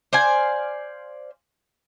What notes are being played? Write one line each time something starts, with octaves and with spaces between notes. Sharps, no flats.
C5 D5 F5 G#5